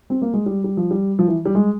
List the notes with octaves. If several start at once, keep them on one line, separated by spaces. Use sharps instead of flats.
C4
A#3
G#3
G3
G3
F3
G3
F3
E3
G3
G#3